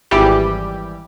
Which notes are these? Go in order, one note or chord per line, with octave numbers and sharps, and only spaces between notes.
G#1 E3 G3 G4